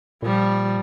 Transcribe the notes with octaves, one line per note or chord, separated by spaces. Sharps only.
A#2 F3 G3